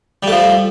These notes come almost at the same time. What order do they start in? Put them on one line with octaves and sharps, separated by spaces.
G3 A3 F3